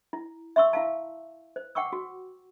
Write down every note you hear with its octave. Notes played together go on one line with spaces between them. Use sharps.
E4
E5 C6 C#6 E6
E4 F5 A5
C5
F#5 G5 C#6 D6 E6
F#4